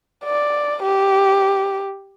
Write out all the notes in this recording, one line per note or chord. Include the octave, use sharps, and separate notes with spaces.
D5
G4